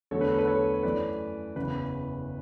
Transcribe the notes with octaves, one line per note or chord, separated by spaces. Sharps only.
E2 D3 F#3 A3 A4 C#5
B4
A4
B4
A4 C#5
C#5
F#2 E3 A3 B4 D5
F#1 E2 C#3 B4